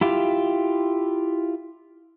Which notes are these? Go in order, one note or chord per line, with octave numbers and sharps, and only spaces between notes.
E4 F4 G4